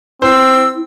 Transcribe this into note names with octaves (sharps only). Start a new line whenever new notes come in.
C4 E4 C5 E6